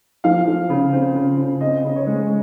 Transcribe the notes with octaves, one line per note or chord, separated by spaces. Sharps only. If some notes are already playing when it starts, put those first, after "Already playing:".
F3 F5
F3
C#3
C4
C#3
C#3
C4 D#5
C#3
C#5
G#3